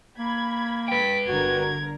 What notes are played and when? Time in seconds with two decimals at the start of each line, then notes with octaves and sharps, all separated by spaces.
0.18 A#3 B5 G#6
0.88 B4 G5 B6 D7
1.28 G1 D3 F#4 A#4 G#6